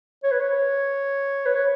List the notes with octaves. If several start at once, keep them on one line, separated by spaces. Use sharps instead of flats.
C#5
B4
C#5
B4
C#5